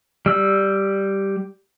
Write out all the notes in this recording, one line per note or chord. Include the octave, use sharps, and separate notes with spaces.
G3 E6